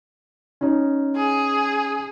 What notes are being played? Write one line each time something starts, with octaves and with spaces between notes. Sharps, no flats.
C#4 D#4
G#4